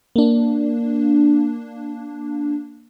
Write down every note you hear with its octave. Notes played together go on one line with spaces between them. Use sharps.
A#3 D4